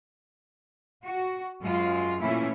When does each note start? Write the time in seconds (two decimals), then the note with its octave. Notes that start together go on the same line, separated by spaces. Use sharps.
1.04 F#4
1.61 F#2 G#3 F4 F5
2.21 A#2 E3 A3 C#4 E4